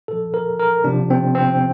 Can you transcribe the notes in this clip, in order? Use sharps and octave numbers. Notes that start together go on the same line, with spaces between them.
A#2 F3 A4
A#4
A#4
C3 F3 D4
C4
C4